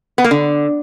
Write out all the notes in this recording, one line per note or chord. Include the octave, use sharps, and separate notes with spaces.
B3
A#3
D3